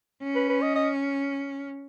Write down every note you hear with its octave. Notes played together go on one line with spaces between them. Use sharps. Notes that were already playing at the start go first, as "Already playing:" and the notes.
C#4
B4
B4
D#5
D#5